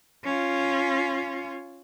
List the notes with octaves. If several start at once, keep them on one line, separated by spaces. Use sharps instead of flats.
C#4 F4